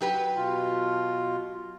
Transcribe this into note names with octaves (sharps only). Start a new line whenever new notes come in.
F#3 G4 B4
B2 F4